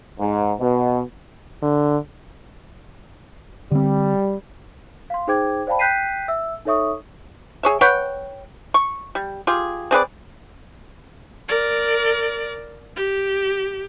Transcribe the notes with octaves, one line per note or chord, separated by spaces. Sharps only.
G#2
B2
D3
D3 G3 C4
F5 C6
D#4 G#4 C5 G5 D6 G#6
C5 D5 F5 G5 A5 B5
G5 F#6 G6 B6 C7 D#7
E5 E6
D#4 A4 C#5 E5 C#6 D#6
G#4 C#5 E5
B4 C#5 F#5 G5
C#6
G3
F4 G4 G#4
C4 G#4 B4 D5
A#4 D5
G4